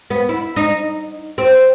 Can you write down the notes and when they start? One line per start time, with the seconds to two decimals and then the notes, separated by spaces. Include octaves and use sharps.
0.10 B3
0.29 E4
0.56 D#4
1.38 C4